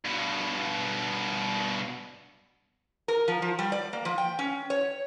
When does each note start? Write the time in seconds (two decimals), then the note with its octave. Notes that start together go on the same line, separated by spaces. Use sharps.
0.05 G2 B2
3.08 A#4
3.28 F3
3.42 F3
3.59 G3
3.72 D5
3.93 A#3
4.05 F3
4.18 G5
4.39 C#4
4.70 C#5